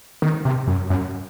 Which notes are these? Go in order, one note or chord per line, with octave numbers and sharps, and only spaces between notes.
D#3
C3
F#2
F#2